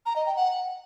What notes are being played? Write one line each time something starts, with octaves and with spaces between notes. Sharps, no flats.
A#5
D#5
G5
F#5